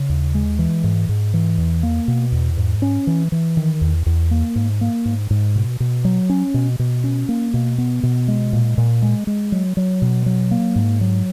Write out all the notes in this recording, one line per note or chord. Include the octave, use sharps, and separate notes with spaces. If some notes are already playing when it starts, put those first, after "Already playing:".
Already playing: C#3
D#2
G#3
E3
G#2
G#2
E3
E2
A#3
B2
E2
G#2
C#4
E3
E3
D#3
E2
E2
A#3
G#2
A#3
G#2
G#2
B2
B2
F#3
C#4
B2
B2
C#4
A#3
B2
B3
B2
G#3
A#2
A#2
G#3
G#3
F#3
F#3
B2
F#3
A#3
G#2
F#3